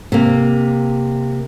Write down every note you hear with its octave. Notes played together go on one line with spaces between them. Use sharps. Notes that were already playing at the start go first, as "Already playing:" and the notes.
C3 A#3